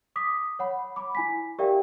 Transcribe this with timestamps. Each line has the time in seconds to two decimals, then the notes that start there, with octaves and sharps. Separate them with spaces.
0.16 D6 D#6 B6
0.59 C#5 F#5 B5
0.96 B5 D6
1.15 E4 G#5 B6
1.59 G4 A#4 D5 E5 F5 G5